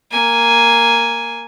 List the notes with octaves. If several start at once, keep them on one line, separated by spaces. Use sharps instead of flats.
A#3 G#5